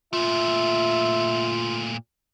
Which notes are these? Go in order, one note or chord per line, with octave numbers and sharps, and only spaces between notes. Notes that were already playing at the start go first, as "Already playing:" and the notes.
A#2 A3 F4 E5